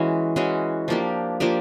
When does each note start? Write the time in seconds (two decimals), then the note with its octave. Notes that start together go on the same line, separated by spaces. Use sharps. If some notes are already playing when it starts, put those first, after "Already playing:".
Already playing: E3 G#3 C#4 F#4
0.36 E3 G#3 C#4 F#4
0.88 F3 A#3 D4 G4
1.40 F3 A#3 D4 G4